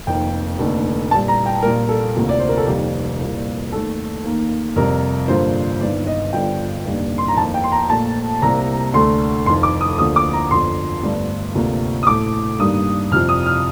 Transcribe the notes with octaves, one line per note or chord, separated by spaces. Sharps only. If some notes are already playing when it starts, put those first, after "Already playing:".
F1 F2 D#3 A#3 G5
F1 D#2 D3 A3
A#1 A#2 G3 A5
A#5
G5
A#1 A#2 G3 A#3 A#4
A4
D2 C3 F3 A#3
D5
C5
A#4
A4
F1 F2 D#3 G3 A#3 G4
C2 A#2 G3 A#3
D#2 D#3 A3 A4
D#2 D#3 A#3
F2 C3 G3 A#4
G2 D3 F3 A#3 C5
G1 G2 D#3 D5
D#5
G1 G2 D3 F3 G5
F1 D#2 D3 G3 A#3
C6
A#5
F2 D#3 A#3 A5
G5
C6
A#5
A#1 A#2 A3 A5
C2 C3 G3 A#3 A#5
D2 D3 A3 C6
F1 F2 D#3 C6
D6
D#6
D2 D3 F3 A#3 D#6
D6
A#5
G1 F2 D3 F3 C6
G1 G2 D3 A3
D2 C3 F3 A#3
D#6
A1 A2 A3 D6
G2 D#3 G3 A#3 D#6
F2 C3 F3 F6
D#6
F6